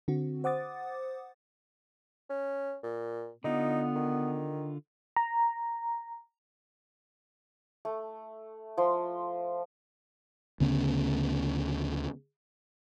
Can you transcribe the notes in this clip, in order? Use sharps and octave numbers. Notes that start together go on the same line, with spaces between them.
D3 C4 F#4
C5 F#5 D6 D#6 A6
C#4
A#2
D3 B3 D#4 F4
D#3
A#5
A3
F3 C6
D2 C#3 B3 C#4